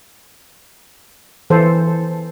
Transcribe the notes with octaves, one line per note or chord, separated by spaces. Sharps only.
E3 A4 C5